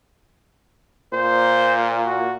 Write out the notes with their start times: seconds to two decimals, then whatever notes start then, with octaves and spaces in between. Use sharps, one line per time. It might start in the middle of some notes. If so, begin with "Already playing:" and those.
1.13 A#2 C5
2.06 F#4